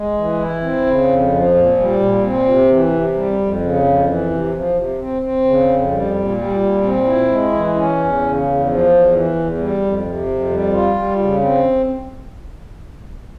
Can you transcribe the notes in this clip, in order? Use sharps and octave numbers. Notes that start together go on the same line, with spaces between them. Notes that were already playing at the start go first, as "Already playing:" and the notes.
Already playing: G#3
E3
E4
C4
C#3
F2
F3
A#2
G3
A#2
C4
C3
E3
C3
G3
F2
C#3
F2
E3
C3
F3
C3
C4
C4
C#3
F2
G3
A#2
G3
A#2
C4
E4
G#3
E3
C#4
E2
C#3
E2
F3
E2
E3
E2
G3
F2
C3
F2
G3
F4
G3
C#3
C4